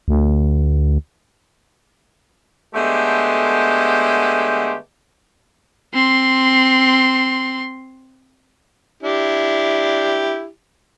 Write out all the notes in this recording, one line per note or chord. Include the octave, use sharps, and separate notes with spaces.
D2
D3 G#3 A3 B3 G4 C5
C4 C6
D4 E4 G4